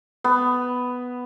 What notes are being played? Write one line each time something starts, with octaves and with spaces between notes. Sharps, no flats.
B3